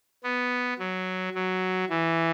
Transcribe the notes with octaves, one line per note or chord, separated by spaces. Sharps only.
B3
F#3
F#3
E3